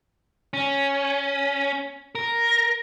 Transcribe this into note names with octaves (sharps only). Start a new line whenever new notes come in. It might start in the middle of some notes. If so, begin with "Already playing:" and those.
C#4
A#4